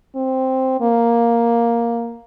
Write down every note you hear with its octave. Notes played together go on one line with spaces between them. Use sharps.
C4
A#3